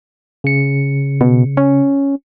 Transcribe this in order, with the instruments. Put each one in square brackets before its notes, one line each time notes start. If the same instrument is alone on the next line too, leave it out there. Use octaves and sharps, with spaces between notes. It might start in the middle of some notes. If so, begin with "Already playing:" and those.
[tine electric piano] C#3 C#7
[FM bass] B2
C#4